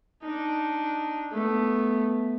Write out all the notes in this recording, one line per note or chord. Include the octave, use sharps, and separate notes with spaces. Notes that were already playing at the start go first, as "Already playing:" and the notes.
D4 D#4
A3 B3